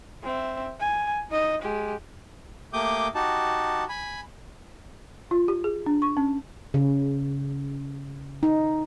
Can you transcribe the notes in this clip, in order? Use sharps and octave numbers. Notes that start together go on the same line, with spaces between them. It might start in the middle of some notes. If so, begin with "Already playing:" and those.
C4 E5
G#5
D#4 D#5
G#3 G4
A3 A#3 G4 D6 D#6 G6
D#4 F#4 G4 A5
G#5 B5
F4
G4
G#4
D4
C#6
C#4
C#3
D#4